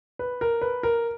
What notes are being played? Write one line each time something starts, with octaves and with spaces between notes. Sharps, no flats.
B4
A#4
B4
A#4